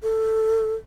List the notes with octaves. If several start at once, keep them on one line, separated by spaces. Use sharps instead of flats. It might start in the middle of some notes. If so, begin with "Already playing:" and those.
A4